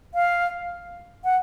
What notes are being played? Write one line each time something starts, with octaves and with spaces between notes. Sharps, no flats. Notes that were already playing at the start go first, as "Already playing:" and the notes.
F5
F#5